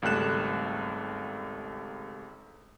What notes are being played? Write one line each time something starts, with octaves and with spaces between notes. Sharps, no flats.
G#1 C#2 G3 A3 F#6 E7